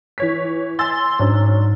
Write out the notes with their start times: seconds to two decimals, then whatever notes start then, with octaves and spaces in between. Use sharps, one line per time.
0.18 E3 C#5 B6
0.79 G#5 C6 E6 A6
1.19 G#2 F#3 C#4 D4